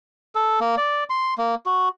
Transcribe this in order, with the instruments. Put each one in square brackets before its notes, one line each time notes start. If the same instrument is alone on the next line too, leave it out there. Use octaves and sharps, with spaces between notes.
[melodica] A4
A#3
D5
C6
A#3
F#4